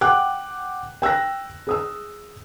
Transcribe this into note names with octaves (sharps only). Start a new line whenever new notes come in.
F#5 G5 D6 F#6
G5 E6 F#6 A#6
G#4 D#6 E6